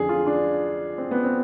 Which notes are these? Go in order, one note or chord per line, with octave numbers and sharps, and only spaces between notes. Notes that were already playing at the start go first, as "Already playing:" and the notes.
Already playing: F2 D3 F3 G#4
F4
D4
C4
B3
C4